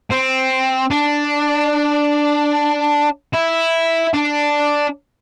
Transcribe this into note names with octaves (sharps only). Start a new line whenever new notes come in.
C4
D4
E4
D4